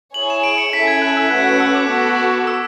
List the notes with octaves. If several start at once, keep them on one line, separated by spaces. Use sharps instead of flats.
E4 G#4 C#5 G#5 F#7
E7
D7
C#7
C#4 E4 A4 E5 G#5 B6
G#6
F#6
E6
A3 C#4 F#4 B4 F#5 F#6
F#6
E6
D6
B3 F#4 A4
E6